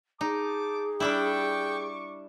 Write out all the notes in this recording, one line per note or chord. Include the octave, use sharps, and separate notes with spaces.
D#4 G#4 G5 A5 D6
G3 D4 E4 G5 C#6 D6